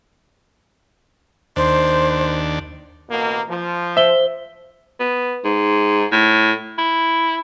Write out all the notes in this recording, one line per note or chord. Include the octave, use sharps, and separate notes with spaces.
D#2 D4 C5
A1 B2 A#3
F3
C5 E5 G7
B3
G#2
A2
E4